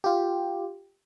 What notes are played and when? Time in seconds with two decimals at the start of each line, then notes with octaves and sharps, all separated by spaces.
0.04 F4 G4